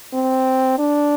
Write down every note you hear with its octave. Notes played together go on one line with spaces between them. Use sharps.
C4
D4